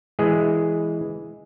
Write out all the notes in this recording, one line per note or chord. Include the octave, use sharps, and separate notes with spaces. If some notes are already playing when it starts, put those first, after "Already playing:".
E3 G#3 G#4